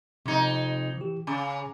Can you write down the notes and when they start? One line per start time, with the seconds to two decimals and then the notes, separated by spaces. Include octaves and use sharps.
0.26 F2 C3 D#4 G#6
0.97 E3 G4
1.27 C#3 G#5 A#5 D6